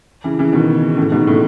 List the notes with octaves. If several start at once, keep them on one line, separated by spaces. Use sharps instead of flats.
C#3 E3
C#3 E3
B2 D#3
A2 C#3
G#2 B2
A2 C#3